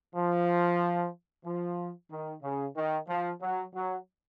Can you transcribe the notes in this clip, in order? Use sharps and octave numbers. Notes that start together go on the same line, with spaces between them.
F3
F3
D#3
C#3
D#3
F3
F#3
F#3